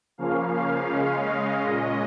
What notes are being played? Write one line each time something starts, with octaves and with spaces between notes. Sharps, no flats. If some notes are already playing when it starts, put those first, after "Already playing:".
C#3 F3 A#3 C#4 F5
F5
C#3 G#3 C#4 F5
D#5
A#2 G#3 C#4